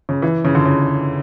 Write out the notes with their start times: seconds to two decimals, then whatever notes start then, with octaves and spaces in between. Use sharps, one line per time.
0.09 C#3
0.22 E3
0.45 C#3
0.55 D3
0.66 C#3